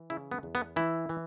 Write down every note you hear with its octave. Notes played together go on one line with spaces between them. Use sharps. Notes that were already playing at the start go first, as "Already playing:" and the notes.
Already playing: E3
C#3 E4
B3
E2
B3
E3 E4
E3